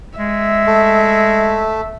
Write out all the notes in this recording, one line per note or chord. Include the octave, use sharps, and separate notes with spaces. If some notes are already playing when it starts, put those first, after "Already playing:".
G#3 E5
A3